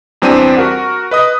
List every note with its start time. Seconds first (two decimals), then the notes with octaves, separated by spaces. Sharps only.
0.22 E2 G3 C4 D4 G4 D#7
0.57 F#4 A#4 F#5
1.11 B4 D#5 D#6